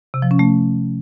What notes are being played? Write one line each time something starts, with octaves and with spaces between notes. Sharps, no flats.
C3
F3
C#4
A3